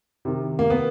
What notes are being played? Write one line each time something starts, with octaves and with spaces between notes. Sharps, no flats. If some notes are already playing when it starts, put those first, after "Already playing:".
C3 D#3
A#3
B3